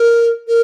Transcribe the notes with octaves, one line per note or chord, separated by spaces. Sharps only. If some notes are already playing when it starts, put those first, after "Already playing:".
Already playing: A#4
A#4